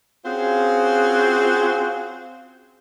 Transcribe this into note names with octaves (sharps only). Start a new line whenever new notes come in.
C4 C#4 F4 F#4 G#4 C5